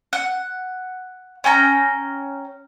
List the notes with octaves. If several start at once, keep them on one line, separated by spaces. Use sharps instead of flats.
F#5
C#4 G5 A5 A#5